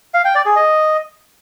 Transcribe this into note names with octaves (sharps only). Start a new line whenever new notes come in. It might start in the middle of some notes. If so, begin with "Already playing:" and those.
F5
G5
D5
G#4
D#5